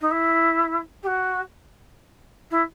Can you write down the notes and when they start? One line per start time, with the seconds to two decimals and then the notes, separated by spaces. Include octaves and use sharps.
0.01 D#4
0.11 E4
1.03 G4
1.07 F#4
2.51 E4